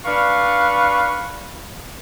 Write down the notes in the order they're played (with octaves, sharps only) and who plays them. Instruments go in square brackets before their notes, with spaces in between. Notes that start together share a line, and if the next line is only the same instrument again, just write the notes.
[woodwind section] D4 B4 F5 C#6